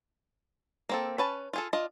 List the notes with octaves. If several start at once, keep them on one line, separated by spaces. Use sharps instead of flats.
A#3 C4 A4
C#4 B4 A5
F4 G#4 A4
D4 F4 D#5